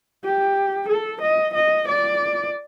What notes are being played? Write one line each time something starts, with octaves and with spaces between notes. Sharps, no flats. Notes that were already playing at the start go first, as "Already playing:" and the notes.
G4
A4
D#5
D#5
D5